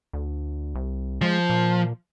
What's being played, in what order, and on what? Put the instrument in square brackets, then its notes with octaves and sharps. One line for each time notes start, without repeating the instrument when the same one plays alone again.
[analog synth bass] D2
C2
[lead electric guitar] F3 [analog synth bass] G#3
[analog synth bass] A#2